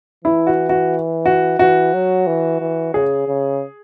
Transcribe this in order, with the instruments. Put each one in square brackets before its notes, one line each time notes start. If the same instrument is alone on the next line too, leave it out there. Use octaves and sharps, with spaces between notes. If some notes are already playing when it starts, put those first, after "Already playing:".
[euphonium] E3 [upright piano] E4
[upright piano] F#4
F#4
F#4
[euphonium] E3 [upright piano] F#4
[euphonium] F#3
E3
E3
[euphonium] C#3 [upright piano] G#4
[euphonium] C#3